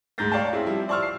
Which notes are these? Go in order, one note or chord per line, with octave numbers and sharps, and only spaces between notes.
D2 G#2 G#3 G6 A6 A#6
C#5 D5 F5 G5 A5
C4 C#4 E4 G#4
F3 G3 E4
C5 D5 A5 C#6 E6 F6
C7